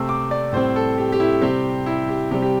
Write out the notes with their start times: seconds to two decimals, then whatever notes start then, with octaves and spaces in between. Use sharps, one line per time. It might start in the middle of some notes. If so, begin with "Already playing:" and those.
Already playing: C3 A3 C4 E6
0.09 D6
0.31 D5
0.53 A2 G3 C4 C5
0.76 A4
0.98 G4
1.12 G4
1.20 E4
1.41 C3 G3 C4 G4
1.86 E4
2.09 G4
2.31 C3 G3 C4 G4
2.42 G4